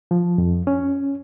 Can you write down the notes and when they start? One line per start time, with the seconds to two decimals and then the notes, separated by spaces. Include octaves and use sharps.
0.11 F3
0.38 F2
0.67 C#4